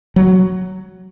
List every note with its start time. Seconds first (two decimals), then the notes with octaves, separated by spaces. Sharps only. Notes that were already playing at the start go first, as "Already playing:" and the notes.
0.16 F#3